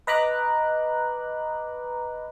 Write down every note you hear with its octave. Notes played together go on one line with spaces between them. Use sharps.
B4 D#5 A#5 B5 D6 F#6